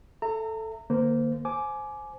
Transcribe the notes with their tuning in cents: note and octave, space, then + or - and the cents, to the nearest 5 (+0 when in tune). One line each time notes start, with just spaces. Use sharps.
A4 +0 E5 +10 A#5 -30
D3 +45 A#3 -5 C5 -25
C5 +0 G#5 +25 D6 +0